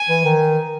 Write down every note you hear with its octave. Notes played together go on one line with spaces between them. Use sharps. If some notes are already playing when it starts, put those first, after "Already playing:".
Already playing: G#5
E3
D#3